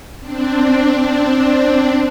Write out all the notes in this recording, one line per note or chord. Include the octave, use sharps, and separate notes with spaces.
C4 D4